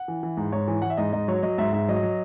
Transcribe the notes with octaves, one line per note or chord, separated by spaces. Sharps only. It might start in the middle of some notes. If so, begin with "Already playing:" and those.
Already playing: F#5
E3
E3
G#2
G#2 C#5
E3
E3 F#5
E5
G#2 D#5
G#2 D#5
F#3 C#5
F#3 D#5
G#2 E5
G#2 E5
F#3 D#5
F#3